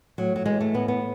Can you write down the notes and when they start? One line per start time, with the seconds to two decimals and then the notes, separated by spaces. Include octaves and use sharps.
0.18 A2 F#3
0.36 F#3
0.46 E3 G#3
0.61 A3
0.74 A2 B3
0.88 B3